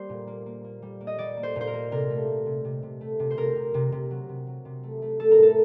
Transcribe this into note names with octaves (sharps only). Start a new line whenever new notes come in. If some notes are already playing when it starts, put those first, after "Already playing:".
Already playing: G3 A#3 C5
A#2
A#3
A#3
A#3
G3
A#3
D#5
G3 D5
A#3
C5
A#2
C5
A#4
A#3
C3 A#4
A3
A3
C3
C3
C3
A3
C3
C5
C3 A#4
C3
C3
C3
F#3
C3
F#3
C3
A3
A3
A3 A4
A#4
A2 A4